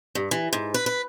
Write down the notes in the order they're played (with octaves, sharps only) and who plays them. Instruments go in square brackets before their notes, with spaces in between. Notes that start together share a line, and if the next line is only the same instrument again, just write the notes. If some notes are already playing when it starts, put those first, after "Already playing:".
[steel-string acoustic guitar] G2
E3
G#2
B4
B4